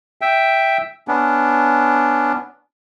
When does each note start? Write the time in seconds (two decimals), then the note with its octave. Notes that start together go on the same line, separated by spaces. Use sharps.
0.21 E5 G5
1.08 B3 C#4 D4